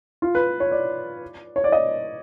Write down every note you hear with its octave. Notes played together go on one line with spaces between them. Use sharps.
F4
B4
C#5
D5
C#5
D5
D#5